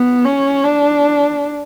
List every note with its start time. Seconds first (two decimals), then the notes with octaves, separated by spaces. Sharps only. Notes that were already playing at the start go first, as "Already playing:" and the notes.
Already playing: B3
0.25 C#4
0.64 D4